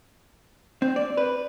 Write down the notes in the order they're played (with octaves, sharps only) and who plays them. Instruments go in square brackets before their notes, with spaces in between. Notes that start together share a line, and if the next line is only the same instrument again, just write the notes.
[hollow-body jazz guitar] C4
D5
B4